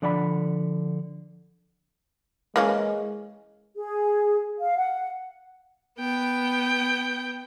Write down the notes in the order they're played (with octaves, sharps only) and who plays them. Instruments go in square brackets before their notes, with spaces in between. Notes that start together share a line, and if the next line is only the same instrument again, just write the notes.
[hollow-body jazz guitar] D3 F3 D5 F#5 A5 B5
[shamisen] E3 A#3 C#4 [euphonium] G#3
[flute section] G#4
F5
F#5
[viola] B3 G5